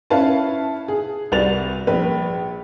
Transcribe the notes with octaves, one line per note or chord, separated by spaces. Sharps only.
C#4 E4 B4 F5 A5
G#4
C2 F#4 B4 A6 F7
A#1 B4